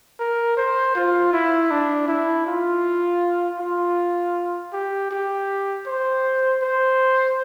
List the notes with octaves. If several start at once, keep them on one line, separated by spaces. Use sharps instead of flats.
A#4
C5
F4
E4
D4
E4
F4
F4
G4
G4
C5
C5